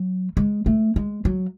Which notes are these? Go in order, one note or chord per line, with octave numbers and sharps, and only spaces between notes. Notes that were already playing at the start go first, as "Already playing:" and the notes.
Already playing: F#3
G#3
A3
G#3
F#3